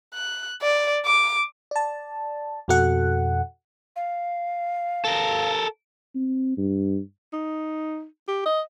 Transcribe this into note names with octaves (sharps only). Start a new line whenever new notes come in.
F#6
D5
D6
D5 A5
F2 B2 F#4 A4 F#5
F5
A4 A#4
C4
G2
D#4
G4
D#5